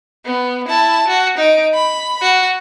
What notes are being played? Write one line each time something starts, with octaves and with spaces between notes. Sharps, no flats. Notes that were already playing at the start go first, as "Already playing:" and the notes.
B3
E4 A5
F#4
D#4 D7
B5
F#4